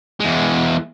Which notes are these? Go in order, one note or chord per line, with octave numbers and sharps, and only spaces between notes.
E2 G#3